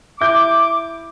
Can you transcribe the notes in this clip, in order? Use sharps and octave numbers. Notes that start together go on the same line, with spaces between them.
E4 D6 G6